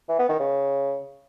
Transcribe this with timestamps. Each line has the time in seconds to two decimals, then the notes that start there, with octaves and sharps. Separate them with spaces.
0.09 E3
0.19 B3
0.29 D#3
0.39 C#3